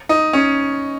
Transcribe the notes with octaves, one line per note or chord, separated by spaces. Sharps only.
D#4
C#4